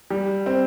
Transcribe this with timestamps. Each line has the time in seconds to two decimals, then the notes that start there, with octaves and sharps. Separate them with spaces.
0.10 G3
0.46 C4